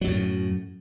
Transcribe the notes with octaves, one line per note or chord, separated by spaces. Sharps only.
F#2 A2 F#3